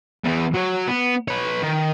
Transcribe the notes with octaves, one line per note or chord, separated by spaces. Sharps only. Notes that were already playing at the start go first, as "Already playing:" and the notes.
E2 E3
F#3 C#5
B3
B4 C#5
D#3